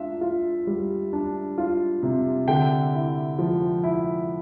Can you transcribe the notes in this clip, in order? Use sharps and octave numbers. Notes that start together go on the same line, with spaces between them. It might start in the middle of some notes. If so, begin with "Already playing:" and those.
Already playing: D4 F4 E5
F4
G3
D4
F4
C3
D3 G5
E4
F3
E4